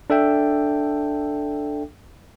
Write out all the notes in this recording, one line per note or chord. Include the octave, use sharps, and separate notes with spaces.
D4 A4 E5 G5